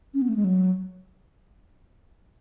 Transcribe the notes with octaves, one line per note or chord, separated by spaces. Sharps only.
C#4
B3
A3
G#3
F#3